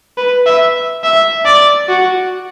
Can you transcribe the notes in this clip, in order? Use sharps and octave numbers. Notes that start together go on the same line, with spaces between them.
B4
E5
E5
D5
F#4